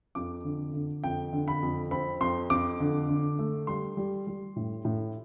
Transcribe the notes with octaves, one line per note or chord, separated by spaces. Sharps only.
F2 D6
D3
D3
F2 G5
D3
B5
F2
C4 B5
F2 C6
F2 D6
D3
D3
A3
G3 C6
G3
G3
A2
A2